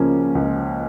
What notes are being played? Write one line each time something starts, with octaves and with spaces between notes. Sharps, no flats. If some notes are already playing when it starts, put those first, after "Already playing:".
Already playing: C#2 C#3 F3 A#3 C#4
C#2